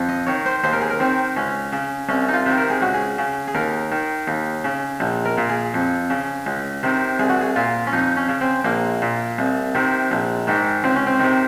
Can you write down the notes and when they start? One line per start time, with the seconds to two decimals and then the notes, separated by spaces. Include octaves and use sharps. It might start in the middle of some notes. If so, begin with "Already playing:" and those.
Already playing: F2
0.09 D#5
0.27 D#3 C#5
0.46 C5
0.64 D#2 C5
0.73 A#4
0.81 G#4
0.90 A#4
1.00 D#3 C4
1.37 C#2 C#4
1.73 C#3
2.09 C2 C#4
2.29 D#4
2.33 F4
2.46 C3 D#3
2.58 A#4
2.70 G#4
2.82 C#2 F#4
2.94 G#4
3.18 C#3
3.48 G#4
3.55 D#2 A#4
3.92 D#3
4.28 D#2
4.64 C#3
5.00 A#1
5.25 A#4
5.38 A#2
5.49 G#4
5.74 F2
6.10 C#3
6.47 C#2
6.83 C3 D#3
7.19 C2 G#4
7.30 F#4
7.41 G#4
7.56 A#2 F4
7.87 C#4
7.93 F2 D#4
8.17 C#4
8.29 C#3
8.41 C4
8.65 A#1 A#3
9.02 A#2
9.39 C2
9.75 C3 D#3
10.11 A#1
10.47 G#2 D#3
10.84 C#2 C4
10.96 C#4
11.07 C4
11.20 C3 D#3